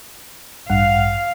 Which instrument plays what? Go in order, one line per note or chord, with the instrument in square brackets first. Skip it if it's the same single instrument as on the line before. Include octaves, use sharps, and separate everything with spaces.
[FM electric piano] A1 G2 F#5 [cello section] F5